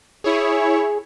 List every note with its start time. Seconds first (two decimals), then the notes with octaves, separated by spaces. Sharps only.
0.24 E4 G#4 C#5